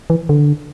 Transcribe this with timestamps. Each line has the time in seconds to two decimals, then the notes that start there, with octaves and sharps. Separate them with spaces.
0.10 E3
0.29 D3